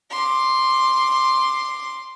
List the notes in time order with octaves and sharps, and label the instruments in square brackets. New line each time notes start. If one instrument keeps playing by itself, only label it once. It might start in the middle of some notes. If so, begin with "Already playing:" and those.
[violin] C6 D6